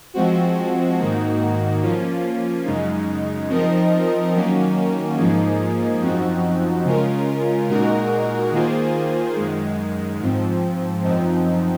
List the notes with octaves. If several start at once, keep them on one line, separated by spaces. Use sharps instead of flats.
F3 G#3 C4 F#4
G#2 D#3 A#3 D#4 F#4
F3 A#3 C#4 F4
F#2 C#3 G#3 D#4
F3 C4 D#4 A#4 D#5
D#3 F#3 A#3 C#4
G#2 F3 A#3 D#4 G#4
F#2 F3 C4 D#4 F#4
C#3 G#3 C#4 F4 A#4
A#2 G#3 D#4 F#4 A#4
D#3 A#3 F4 G#4 C5
F#2 D#3 G#3
G#2 F3 C4
F#2 F3 C4 D#4